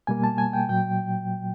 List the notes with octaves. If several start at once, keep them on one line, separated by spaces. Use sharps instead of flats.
B2 G3 A#3 G#5
A5
G#5
G5
A#2 F#3 G5